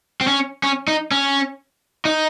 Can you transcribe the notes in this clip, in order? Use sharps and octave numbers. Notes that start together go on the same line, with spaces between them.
C4
C#4
C#4
D#4
C#4
D#4